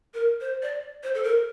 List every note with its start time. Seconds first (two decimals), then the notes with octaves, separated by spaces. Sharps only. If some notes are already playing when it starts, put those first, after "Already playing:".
0.14 A#4
0.41 C5
0.62 D5
1.03 C5
1.15 A4
1.23 A#4